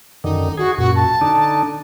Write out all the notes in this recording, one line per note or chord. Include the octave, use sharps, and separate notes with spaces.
F#2 D3 D#3 D#4
F#4 G#4
F#2 A#2 F#4
A5
D3 D4 D#4